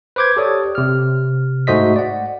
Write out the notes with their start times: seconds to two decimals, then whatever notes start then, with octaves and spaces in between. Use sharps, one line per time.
0.16 B4 C5 D6 G6 G#6
0.37 G4 A4 C#5 D5 D#6
0.75 C3 F6
1.67 G#2 A3 F#4 C5 D#5 B6
1.96 D5 F#5